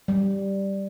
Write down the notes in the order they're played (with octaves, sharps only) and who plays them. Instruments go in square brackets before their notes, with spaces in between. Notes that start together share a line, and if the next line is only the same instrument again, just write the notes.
[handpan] G3